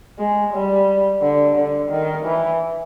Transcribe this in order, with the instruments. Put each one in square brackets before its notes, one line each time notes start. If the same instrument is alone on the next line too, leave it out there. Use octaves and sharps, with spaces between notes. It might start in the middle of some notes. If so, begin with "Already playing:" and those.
[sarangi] G#3
G3
D3
D3
D#3
E3